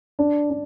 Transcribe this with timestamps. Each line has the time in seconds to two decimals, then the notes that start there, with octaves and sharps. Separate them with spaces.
0.19 D4
0.50 D4